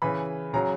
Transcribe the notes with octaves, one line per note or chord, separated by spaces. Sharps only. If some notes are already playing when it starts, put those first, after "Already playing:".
C#3 E3 B5
C#3 F#3 A#5